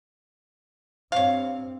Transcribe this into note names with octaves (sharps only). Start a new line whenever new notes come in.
G2 C4 C#5 F5